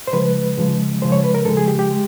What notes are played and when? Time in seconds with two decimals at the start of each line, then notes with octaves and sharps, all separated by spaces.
0.07 C5
0.13 C#3 F3 G#3 B4
0.58 C#3 F3 G#3
1.02 C#3 F3 G#3 C5
1.12 C#5
1.24 B4
1.35 A#4
1.45 C#3 F3 G#3 A4
1.57 G#4
1.68 G4
1.79 G4
1.90 G#3